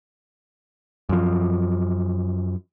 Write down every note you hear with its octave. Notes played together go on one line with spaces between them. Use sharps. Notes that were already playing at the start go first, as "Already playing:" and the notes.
F#2 F3